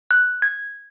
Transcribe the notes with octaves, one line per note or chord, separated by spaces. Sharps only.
F#6
G#6